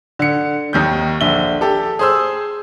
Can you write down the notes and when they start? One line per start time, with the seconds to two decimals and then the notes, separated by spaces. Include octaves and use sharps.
0.19 D3 C#7
0.73 D#2 D#3 G6
1.21 A#1 D3 E5 G7
1.61 G4 A4
1.99 G#4 C5 E6